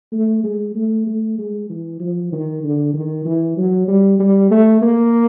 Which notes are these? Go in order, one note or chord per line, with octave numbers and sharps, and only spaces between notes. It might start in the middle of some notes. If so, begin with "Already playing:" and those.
A3
G#3
A3
A3
G#3
E3
F3
D#3
D3
D#3
E3
F#3
G3
G3
A3
A#3